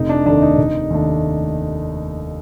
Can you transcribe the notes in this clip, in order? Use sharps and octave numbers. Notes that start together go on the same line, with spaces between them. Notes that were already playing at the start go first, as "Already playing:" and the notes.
Already playing: F1 D#4
D4
D#2 D#3 A3 D4
D#4
F1
D#2 D#3 A3 D4